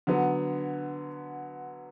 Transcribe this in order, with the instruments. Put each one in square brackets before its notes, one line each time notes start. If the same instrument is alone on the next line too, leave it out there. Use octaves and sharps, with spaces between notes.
[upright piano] D3 F#3 B3